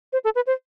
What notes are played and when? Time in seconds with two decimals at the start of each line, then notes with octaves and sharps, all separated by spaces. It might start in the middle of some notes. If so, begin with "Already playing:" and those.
0.13 C5
0.24 A4
0.35 B4
0.47 C5